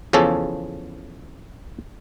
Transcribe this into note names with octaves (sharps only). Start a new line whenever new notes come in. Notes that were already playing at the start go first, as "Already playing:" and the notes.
E2 C#3 F3 C#4 A4